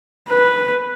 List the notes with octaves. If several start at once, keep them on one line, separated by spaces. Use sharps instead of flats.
B4